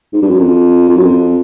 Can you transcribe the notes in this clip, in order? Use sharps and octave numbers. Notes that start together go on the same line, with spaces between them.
G#2
G2
F#2
F2
F2
F#2
F2